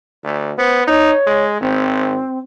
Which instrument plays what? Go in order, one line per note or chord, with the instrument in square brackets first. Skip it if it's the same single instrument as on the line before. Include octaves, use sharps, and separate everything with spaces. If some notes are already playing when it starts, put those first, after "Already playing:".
[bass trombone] D2
[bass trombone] B3 [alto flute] C5
[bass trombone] D#4 [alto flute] C#5
[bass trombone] G#3
[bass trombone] G#1 [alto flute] C4